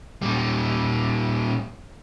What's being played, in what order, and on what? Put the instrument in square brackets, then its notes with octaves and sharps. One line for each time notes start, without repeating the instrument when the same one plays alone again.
[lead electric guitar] A#2 G3